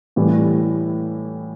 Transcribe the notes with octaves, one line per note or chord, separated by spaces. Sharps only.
A2 E3 G3